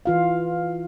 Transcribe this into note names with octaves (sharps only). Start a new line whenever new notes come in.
E3 F4 F5